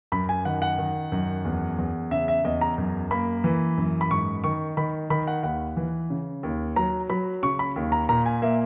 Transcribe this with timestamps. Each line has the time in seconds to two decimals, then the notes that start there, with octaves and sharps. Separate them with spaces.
0.12 F#2 B5
0.29 G#5
0.45 D#3 F#5
0.62 F#5
0.78 D#3
1.12 F#2
1.45 E2
1.78 E2
2.11 C#3 E5
2.28 E5
2.44 E2 D#5
2.61 A#5
2.78 F#2
3.11 A#3 B5
3.44 E3
3.78 F#2
4.01 B5
4.11 G#2 C#6
4.44 D#3 C#6
4.77 D#3 B5
5.10 D#3 B5
5.27 F#5
5.43 D#2 F#5
5.77 E3
6.10 C#3
6.43 D#2
6.76 F#3 A#5
7.10 F#3 B5
7.43 C#3 C#6
7.59 B5
7.76 D#2
7.92 A#5
8.09 A#2 A#5
8.26 G#5
8.42 A#3 E5